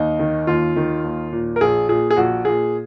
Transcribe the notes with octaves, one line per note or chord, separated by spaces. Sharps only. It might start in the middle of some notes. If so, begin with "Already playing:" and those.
Already playing: D#2 D#4
D#3
D#2 F4
D#3
D#2
A#2
A#4
A#1 G#4
A#2 G#4
G#4
A#1 F#4
A#2 G#4